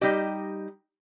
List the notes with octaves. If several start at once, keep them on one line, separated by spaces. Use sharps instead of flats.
G3 D#4 G4 D#5